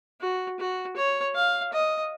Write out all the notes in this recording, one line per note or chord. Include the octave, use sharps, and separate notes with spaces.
F#4
F#4
C#5
F5
D#5